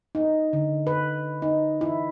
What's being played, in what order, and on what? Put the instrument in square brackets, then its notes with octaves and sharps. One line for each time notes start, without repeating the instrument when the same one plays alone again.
[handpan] D#4
D3
B4
D#4
E4